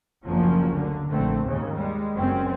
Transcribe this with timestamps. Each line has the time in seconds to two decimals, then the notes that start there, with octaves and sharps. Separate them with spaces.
0.25 F#1 D2 F3 F#3 A#3 C#4
0.75 D3
1.11 A#1 D3 A3 C4
1.44 D#2 G#2 C#3
1.73 G3 G#3
2.15 F#1 F#2 C4 C#4